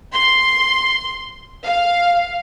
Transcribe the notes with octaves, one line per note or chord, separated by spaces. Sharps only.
C6
F5